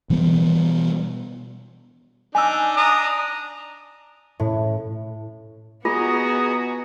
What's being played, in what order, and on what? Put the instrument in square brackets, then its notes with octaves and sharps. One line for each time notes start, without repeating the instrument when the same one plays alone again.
[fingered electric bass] B2 E3 G3 B3
[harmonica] D4 D#4 [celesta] G#5 E6
[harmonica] D4 A#5 D#6
[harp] A2
[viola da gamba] B3 F#4 [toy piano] F4 [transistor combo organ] G#4 D#5 A#5